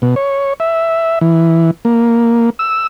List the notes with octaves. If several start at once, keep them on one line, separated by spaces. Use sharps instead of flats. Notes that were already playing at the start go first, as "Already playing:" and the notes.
B2
C#5
E5
E3
A#3
E6